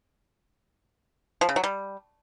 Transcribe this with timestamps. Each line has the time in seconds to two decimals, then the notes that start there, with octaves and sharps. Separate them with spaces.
1.41 F3
1.49 C#3
1.56 F#3
1.64 G3